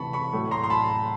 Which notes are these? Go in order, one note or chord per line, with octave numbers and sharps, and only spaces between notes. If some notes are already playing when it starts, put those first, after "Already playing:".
Already playing: C3 E3 A5 B5 C#6
B5 C#6
A2 F#3
A#5 C6
C6
A5 B5